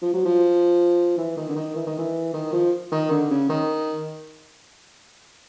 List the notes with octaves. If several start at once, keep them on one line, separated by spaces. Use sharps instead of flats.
F3
F#3
F3
E3
D#3
D3
D#3
E3
D#3
E3
D#3
F3
D#3
D3
C#3
D#3